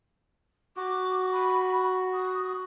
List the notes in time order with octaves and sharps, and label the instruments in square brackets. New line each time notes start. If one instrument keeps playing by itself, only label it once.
[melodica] F#4 [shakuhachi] D6
[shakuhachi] B5
D#6